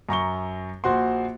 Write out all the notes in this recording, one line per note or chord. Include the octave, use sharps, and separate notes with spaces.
F#2 A#5 C#6 G7
A#1 F#4 C5 F#5 C6